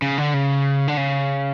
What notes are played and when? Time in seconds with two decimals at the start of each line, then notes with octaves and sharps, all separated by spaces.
0.02 C#3
0.18 D3
0.34 C#3
0.88 D3
0.97 C#3